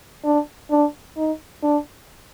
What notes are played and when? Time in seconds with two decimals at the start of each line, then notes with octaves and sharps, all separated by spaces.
0.24 D4
0.70 D4
1.17 D#4
1.63 D4